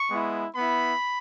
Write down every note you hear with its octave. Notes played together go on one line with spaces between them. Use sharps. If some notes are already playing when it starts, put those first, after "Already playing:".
Already playing: C#6
G#3 B3 E4
B3 E4 B5